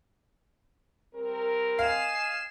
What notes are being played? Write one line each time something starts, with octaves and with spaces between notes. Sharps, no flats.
G3 C4 A#4
D#5 F5 G#5 C7 E7